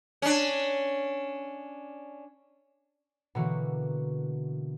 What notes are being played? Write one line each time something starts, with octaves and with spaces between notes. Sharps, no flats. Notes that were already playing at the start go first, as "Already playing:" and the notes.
C#4 D4
B2 D3 E3 A#3 F#4